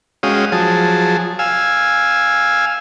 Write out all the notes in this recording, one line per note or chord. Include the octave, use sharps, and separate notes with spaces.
G#3 C#4 F#4 F5 G5 D#6
F3 F#3 G#4 A5
F5 G#5 E6